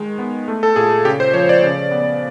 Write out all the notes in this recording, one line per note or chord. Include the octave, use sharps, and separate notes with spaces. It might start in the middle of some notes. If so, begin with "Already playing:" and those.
Already playing: D#3 G#3
B3
A3
A4
A#2 G#4
C#3 G4
C5
F3 C#5
D5
C#3
B3